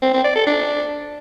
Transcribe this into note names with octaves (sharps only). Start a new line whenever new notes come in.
C4
C4
D5
A4
D4